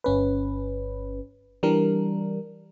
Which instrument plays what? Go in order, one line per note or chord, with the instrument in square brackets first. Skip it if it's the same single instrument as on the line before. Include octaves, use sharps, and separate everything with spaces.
[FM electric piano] G1 C#4 B4
E3 G3 D4 A#4